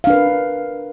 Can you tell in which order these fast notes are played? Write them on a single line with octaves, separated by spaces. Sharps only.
F5 D4 B4 A#4